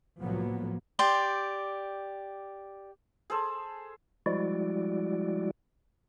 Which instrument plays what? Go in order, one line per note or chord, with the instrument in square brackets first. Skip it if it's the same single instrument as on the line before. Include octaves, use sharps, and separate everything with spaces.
[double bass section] C2 A2 F3 F#3 A#3 B3
[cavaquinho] G4 D5 C6
[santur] G#4 A4 C5
[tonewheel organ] F3 G3 G#3 E4 F#4 D5